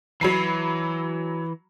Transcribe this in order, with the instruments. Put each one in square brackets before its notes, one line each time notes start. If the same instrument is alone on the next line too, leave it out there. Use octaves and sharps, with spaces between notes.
[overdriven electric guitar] E3 [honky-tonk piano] F#3 B5 C7